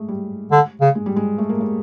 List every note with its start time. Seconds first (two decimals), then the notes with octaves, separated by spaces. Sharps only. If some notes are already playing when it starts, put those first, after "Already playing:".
Already playing: G#3 A3
0.08 G3
0.51 D3
0.81 C#3
0.95 G#3
1.06 G3
1.16 G#3
1.38 A3
1.49 A#3
1.61 A3